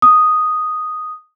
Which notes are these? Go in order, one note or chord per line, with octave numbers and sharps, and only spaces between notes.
D#6